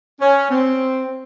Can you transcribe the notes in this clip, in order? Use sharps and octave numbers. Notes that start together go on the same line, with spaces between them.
C#4
C4